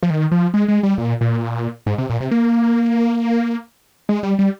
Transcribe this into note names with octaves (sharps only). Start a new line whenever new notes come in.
F3
D#3
F3
G#3
G#3
G3
A#2
A#2
G#2
C3
A#2
C3
A#3
G#3
G3
G3